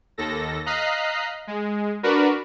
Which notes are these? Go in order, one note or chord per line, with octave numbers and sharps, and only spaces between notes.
D#2 A4 A#6
D#5 F5 A#5 F#6 B6 C7
G#3
D4 F#4 A#4 B4